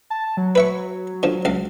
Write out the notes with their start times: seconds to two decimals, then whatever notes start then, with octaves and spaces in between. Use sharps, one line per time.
0.10 A5
0.37 F#3
0.55 B4 E5 C#6
1.23 D3 F3
1.45 C#2 F5